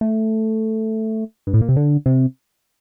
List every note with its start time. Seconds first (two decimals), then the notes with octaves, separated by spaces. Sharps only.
0.01 A3
1.47 G2
1.54 A2
1.61 A#2
1.69 C3
1.77 D3
2.06 C3